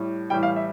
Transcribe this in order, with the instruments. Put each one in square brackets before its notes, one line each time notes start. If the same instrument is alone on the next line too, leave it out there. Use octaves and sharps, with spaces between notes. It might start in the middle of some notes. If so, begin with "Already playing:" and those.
Already playing: [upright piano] A2 G3
A2 E3 G3 G5
F5
E5